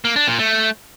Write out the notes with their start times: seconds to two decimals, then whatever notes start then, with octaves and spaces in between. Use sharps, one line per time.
0.05 A#3
0.16 D4
0.28 A#2
0.39 A3